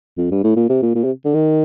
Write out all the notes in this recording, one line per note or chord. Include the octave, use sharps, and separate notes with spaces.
F2
G2
A2
A#2
C3
A#2
A#2
C3
D3
D#3